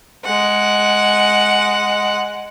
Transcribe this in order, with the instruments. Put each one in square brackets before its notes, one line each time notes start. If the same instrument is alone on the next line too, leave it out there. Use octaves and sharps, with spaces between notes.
[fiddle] G#3 F#5